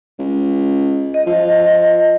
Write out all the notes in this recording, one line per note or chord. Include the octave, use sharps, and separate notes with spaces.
C#2
D#5
F3